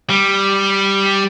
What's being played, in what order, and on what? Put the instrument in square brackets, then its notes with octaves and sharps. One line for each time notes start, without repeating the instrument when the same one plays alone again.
[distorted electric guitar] G3